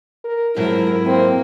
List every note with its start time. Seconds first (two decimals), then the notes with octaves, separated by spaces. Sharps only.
0.24 A#4
0.56 F2 G#2 F#3 E4 A#4
1.05 A#3 C4